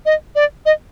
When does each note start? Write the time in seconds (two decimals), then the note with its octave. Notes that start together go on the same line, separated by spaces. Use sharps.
0.06 D#5
0.35 D5
0.66 D#5